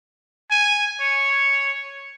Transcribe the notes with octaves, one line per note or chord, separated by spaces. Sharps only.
G#5
C#5